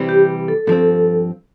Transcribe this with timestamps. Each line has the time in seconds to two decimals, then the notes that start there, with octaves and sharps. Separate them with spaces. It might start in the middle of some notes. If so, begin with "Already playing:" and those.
Already playing: C3 E3 G3 C4
0.09 G4
0.48 A4
0.67 G2 F3 C4 A4